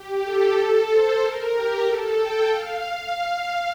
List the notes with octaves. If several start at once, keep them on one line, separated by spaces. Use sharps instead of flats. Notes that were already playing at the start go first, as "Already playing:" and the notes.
Already playing: G4
A4
A4
C5
A#4
G4
A4
G5
F5
F5
F5